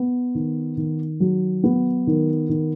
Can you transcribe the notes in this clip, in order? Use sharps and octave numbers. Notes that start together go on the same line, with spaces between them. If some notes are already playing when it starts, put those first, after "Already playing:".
Already playing: B3
D#3
D#3
F#3
B3
D#3
D#3